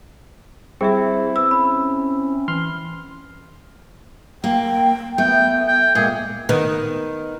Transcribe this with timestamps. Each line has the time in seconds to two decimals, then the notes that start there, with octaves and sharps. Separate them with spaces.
0.81 G3 C4 E4 G#4 E5
1.36 B3 E6
1.51 C#4 B5
2.48 E3 C6 F6
4.44 A#3 G5
5.18 A3 B3 G5
5.68 G5
5.95 A#2 G#3 G#4
6.49 D#3 B3